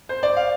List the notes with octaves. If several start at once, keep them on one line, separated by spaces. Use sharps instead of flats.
C5
D5
F5